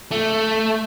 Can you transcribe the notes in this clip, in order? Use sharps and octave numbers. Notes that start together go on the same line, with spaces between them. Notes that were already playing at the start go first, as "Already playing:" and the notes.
A3